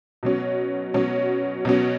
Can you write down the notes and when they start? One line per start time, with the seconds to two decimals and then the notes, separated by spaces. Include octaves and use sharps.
0.23 B2 F#3 C#4
0.94 B2 F#3 C#4
1.65 B2 F#3 C#4